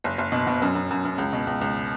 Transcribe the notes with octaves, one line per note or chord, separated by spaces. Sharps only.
F#1
F#1
B2
B2
F#2
F#2
F#2
F#2
C#2
B2
C#2
C#2